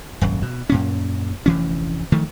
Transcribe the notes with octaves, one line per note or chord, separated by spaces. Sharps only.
D#1 G#1 F#2
B2
F#2 A#2 C#4
F1 D2 E3 C#4
D#3 F3 A3